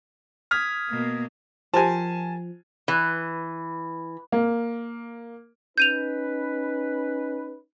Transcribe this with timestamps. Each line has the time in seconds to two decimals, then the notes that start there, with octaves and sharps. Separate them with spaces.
0.51 D#6 F6 G#6 B6
0.90 B2 A#3
1.74 F3 G4 A#4 C5 G#5 A5
2.88 E3
4.32 A#3
5.78 C#4 D#4 B4 G6 D#7 F7